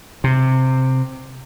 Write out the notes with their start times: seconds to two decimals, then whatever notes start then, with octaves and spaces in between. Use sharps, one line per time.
0.24 C3